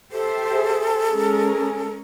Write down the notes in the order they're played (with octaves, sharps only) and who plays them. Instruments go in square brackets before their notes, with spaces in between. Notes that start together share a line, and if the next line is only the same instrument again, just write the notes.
[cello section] G4 C5 E5 [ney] A4
[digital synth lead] G#4
[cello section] G#3 C#4 A#4